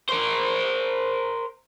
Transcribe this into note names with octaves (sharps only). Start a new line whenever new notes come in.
A#4 C5